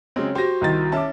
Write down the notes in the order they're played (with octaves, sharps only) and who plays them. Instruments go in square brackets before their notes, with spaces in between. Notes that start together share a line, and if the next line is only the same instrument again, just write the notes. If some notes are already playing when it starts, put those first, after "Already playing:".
[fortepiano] C#3 C#4 [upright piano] F#3 G#3 C4
[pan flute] F#4 [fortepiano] G4 [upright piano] C5 A#6
[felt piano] C2 D#3 A6
[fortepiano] C#4 E5 [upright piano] A5 D6